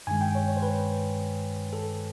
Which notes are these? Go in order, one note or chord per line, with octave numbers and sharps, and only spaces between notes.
G2 D#3 G#3 G#5
G5
C#5
C#5
C5
B4
A4